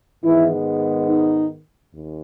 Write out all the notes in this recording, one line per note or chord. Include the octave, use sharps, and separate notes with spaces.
G#2 D#3 E3 G#3 B3 E4
D#4
D#2